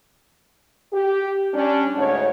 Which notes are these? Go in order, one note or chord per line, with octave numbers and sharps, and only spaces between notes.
G4
G3 C#4 D4
D2 G#2 C#5